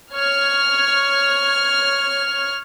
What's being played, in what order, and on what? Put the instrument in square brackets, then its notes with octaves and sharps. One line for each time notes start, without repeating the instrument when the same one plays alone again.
[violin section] C#5 F6